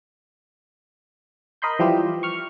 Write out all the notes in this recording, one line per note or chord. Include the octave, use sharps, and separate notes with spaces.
A#4 D#5 B5 C6 G6
E3 F3 G3 E4 G4 C5
C#6 F6